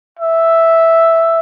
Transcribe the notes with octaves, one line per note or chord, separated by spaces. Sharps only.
E5